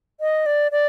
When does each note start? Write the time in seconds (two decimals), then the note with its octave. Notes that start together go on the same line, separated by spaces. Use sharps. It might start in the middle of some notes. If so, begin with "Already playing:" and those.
0.20 D#5
0.46 D5
0.72 D5